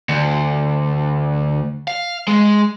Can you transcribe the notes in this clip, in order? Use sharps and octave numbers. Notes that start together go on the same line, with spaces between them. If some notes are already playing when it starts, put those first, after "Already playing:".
D2
F5
G#3